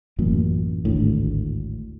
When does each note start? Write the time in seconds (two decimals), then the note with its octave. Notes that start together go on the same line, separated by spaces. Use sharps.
0.19 A1 F#2 A#2
0.85 G#1 D2 A2